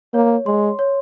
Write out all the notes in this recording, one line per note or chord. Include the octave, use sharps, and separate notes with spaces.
A#3 C#5
G#3 C6
C#5